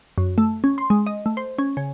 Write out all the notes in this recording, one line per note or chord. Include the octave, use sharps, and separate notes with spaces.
F#2
A3
C#4
C6
G#3
D#5
A3
C5
C#4
C#3